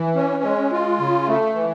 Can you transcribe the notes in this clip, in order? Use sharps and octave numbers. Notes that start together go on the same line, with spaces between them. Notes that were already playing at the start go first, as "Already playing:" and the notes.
Already playing: E3
C#4
G#3
F4
C#3
A3
E3